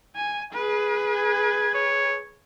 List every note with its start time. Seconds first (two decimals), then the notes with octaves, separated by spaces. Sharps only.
0.16 G#5
0.53 G#4 B4
1.17 G#6
1.74 C#5